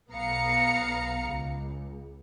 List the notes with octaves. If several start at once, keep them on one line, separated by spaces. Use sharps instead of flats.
B1 B3 F5 A#5 C#7
C#2